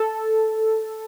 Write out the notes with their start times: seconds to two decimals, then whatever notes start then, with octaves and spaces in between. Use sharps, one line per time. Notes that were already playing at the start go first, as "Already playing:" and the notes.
Already playing: A4